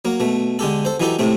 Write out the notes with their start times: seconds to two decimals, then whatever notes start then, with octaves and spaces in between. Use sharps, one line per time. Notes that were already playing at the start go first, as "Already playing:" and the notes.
0.05 F#3 A#3
0.20 B2 A3
0.59 D3 G#3 G4 A4
0.85 A4 C5
1.00 E3 F#3 D#4 G4 A4
1.19 A2 C3 A3 C4